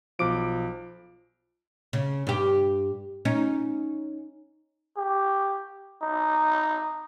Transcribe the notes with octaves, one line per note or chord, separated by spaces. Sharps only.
B1 F3 D6 D7
C#3
G2 G4
C#4 D#4
G4
D#4